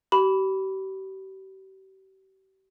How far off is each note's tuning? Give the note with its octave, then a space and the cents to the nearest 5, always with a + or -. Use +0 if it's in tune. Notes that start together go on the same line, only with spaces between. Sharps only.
G4 -40 B5 +0